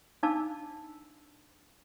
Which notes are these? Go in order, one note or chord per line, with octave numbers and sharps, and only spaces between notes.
D4 D#4 F5 A5 D6 E6